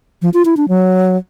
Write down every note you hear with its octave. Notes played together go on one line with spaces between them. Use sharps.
F3
F4
E4
D4
F#3